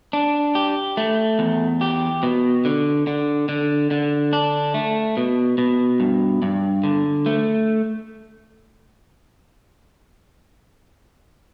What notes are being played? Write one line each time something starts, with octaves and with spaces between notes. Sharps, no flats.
D4
G4
A3
E2
G4
B2
D3
D3
D3
D3
D4
A3
B2
B2
G2
G2
D3
A3